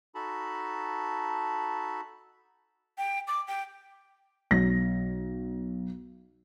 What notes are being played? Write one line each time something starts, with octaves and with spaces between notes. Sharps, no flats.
D#4 F#4 A4 A5 B5
G5
D6
G5
B1 A#6